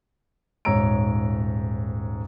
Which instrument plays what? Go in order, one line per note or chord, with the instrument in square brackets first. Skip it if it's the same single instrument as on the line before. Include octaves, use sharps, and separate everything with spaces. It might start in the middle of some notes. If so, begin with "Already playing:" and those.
[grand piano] D#1 G#2 C#5 A#5 E6 D7